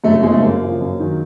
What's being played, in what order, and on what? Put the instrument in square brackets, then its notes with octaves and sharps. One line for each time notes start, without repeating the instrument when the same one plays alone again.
[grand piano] F#2 A3
A3
C#3 F3 G#3
A3
F#2 A#3
C#3 F3
F#2
D#3 F#3